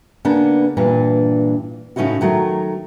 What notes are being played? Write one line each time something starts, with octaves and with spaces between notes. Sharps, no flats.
C#3 A#3 B3 D4
G2 A#2 E3 D4
A2 C#3 C#4 D#4 E4 F#4
D#3 F#3 A3 A#4